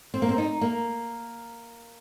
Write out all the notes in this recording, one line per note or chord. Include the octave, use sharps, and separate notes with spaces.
C4
A#3
C4
D#4
A#3